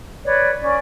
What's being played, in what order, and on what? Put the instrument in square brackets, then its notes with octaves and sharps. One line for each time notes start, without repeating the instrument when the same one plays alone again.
[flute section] B4 C#5 D5
C#4 D5